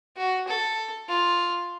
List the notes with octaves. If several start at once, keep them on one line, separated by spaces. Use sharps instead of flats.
F#4
A4
F4